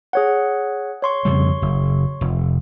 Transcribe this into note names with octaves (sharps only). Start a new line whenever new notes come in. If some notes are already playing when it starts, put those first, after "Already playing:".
G#4 C#5 F#5
C#5 C6 C#6
F2 C#3 G3
F#1
F1